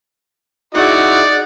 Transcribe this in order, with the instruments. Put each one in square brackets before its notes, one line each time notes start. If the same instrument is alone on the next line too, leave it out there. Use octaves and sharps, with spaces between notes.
[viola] D#4 G#4 [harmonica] E4 F#4 [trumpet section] D5 [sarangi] F#5